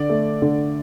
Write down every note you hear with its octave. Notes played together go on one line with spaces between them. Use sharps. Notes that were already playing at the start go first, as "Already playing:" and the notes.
Already playing: D3 D5
A3
D3